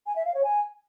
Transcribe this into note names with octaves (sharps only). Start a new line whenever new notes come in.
G#5
E5
F5
C#5
G#5